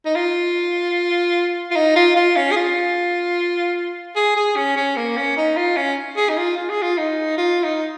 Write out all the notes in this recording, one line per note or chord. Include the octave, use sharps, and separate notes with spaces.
D#4
F4
F4
D#4
F4
F4
C#4
G#4
F4
G#4
G#4
C#4
C#4
A#3
C#4
D#4
F4
C#4
G#4
D#4
F4
F4
G#4
F4
D#4
F4
D#4